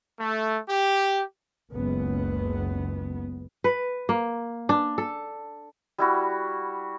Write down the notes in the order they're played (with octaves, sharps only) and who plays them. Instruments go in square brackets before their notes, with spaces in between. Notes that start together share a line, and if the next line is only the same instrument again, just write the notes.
[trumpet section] A3
G4
[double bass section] F#1 C#2 B3
[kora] B4
A#3
D4
A4
[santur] G3 E4 F#4